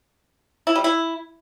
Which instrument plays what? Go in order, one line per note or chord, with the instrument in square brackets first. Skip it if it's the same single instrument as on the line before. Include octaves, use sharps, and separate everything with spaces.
[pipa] E4
G3
E4